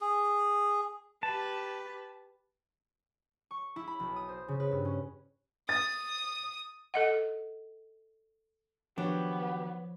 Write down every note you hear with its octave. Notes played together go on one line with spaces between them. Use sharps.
G#4
G4 B4 A5
C#6
E4
B5
B1
D#6
C5
C#3
B4
G2
C#4
D#6 A6
A4 D#5 F#5
D#3 F3 F#3 B3 D4 G4 C#5